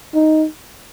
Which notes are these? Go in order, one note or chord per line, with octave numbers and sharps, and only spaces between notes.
D#4